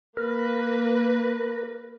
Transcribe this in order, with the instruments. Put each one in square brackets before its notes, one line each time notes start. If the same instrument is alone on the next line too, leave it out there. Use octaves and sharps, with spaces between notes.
[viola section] A#3 B4 [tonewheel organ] A#4